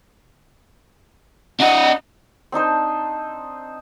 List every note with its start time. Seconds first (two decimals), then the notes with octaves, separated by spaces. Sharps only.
1.60 D4 D#5 F#5
2.52 C4 D4 D#4 C5